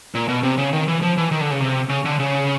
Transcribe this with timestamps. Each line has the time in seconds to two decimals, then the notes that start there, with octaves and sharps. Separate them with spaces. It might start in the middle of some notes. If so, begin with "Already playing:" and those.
0.15 A#2
0.28 B2
0.43 C3
0.58 C#3
0.73 D#3
0.88 E3
1.02 F3
1.17 E3
1.32 D#3
1.41 D3
1.51 C#3
1.60 C3
1.89 C#3
2.05 D3
2.20 C#3